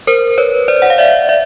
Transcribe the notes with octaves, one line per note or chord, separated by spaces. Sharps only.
A#4 C5
B4 C#5
C5 D5
F#5
F5
D5 E5
D5 E5